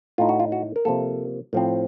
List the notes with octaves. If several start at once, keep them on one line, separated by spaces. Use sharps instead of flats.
A2 A3 D#4 F4
F#4
F4
F#4
A#4
C3 F3 A#3 A4
A2 F3 C4